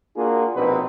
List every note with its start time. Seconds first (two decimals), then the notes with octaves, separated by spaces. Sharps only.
0.17 A#3 D4 F4 F#4 G#4
0.55 A#1 B2 C4 D#4 B4